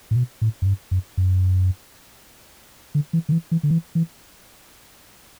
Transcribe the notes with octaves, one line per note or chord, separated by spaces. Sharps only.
A2
B2
A2
F#2
G2
F#2
F#2
D3
E3
D3
E3
E3
D3
E3
E3